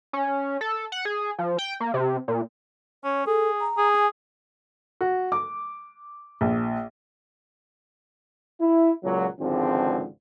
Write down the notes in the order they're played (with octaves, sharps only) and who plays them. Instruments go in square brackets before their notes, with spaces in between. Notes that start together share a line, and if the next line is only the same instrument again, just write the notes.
[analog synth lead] C#4
A4
F#5
G#4
F3
G5
A#3
C3
A#2
[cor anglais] C#4 [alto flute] C#5
[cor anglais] G#4 [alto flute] A4
[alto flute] A#5
[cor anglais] G#4
[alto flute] G#5
[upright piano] F#4
D6
A#1
[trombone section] E4
C#2 A#2 F#3
G#1 C#2 D3 F3 C4